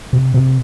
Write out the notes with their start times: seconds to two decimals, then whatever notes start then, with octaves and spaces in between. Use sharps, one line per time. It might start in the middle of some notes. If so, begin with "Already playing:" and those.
0.13 C3
0.34 C3